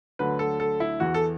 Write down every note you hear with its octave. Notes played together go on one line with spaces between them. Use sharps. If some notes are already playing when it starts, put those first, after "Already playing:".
D2 D3 F#3 B4
A4
A4
E4
E2 E3 F#4
A4